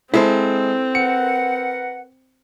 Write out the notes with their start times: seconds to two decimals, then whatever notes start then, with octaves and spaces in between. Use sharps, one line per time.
0.14 G#3 C4 E4 A4 C5
0.95 A#4 B4 F#5 C#7